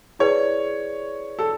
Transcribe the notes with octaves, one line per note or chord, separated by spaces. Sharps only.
E4 G#4 B4 C#5 D5
A4